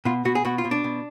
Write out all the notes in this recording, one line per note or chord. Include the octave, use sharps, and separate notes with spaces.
B2 F4
B2 F#4
G#4
B2 F#4
F4
B2
D4
B2